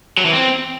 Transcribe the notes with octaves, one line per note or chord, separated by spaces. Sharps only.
F#3
E3
C4